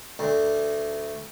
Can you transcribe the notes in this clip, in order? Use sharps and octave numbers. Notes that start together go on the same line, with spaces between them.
D2